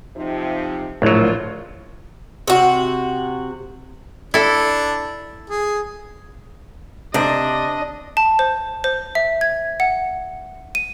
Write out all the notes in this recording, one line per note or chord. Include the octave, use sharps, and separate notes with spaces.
C3 F3 D#4
A#1 A2 D3 F#3 F4
C3 F#4
D4 E4 A4
G#4
C3 D4 C5 D#5
A5
C5
C5
E5
G#6
F#5
D#7